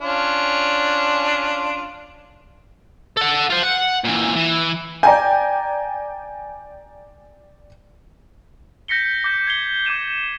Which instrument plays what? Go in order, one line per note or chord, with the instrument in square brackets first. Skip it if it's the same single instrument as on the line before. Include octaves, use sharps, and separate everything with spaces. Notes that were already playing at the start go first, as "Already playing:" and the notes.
[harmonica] C#4 D4 F4
[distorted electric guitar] A4 F#5
F4 C5
F#5
A#2 E3
E3
[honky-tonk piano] D5 G5 G6 [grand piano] G#5 A#5
[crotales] G6 A#6 B6 C#7 G7
D6 G6 A#6
G#6 C7 G7
D6 G6 G#6 D#7 E7 G7